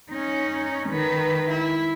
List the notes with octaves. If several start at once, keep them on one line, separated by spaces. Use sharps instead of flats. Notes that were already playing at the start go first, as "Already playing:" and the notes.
C#4 D#4
D#3 B4
E4